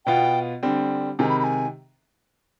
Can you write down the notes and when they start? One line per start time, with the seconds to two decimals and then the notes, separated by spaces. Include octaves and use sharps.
0.06 B2 B3 F4 G5
0.63 D3 G3 C4
1.19 C3 D#3 G#3 G#5
1.29 B5
1.39 B5
1.44 G#5